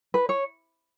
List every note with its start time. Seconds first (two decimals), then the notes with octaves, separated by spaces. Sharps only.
0.14 B4
0.29 C#5